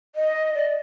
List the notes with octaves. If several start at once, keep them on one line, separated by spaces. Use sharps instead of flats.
D#5
D5